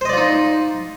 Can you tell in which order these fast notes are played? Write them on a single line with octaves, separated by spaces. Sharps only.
C5 D#5 D5 F4 D#4